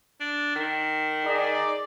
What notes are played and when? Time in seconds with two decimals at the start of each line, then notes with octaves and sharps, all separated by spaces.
0.20 D4
0.55 D#3
1.25 D#4 G#4 D5